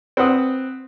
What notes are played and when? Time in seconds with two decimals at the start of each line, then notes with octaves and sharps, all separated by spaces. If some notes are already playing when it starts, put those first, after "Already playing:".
0.17 C4 B4 F#5 D#6